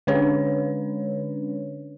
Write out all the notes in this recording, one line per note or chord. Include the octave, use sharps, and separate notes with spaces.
D3 G#3 C#4 D4 B4 C#5